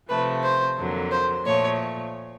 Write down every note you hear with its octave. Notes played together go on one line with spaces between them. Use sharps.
C3 F3 A3 B4
C5
F2 D3 F#3 A#3
C5
A#2 F3 A3 C#5